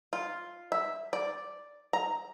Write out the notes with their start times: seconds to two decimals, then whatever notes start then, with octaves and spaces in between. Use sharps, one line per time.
0.13 F4
0.72 E5
1.13 D5
1.93 A#5